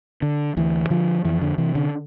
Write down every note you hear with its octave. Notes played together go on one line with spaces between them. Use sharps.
D3
D2 E3
D3 F3
F2 E3
D3
C3 E3
D3